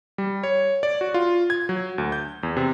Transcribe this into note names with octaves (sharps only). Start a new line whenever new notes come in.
G3
C#5
D5
F#4
F4
G#6
F#3
D2
G6
E2
C3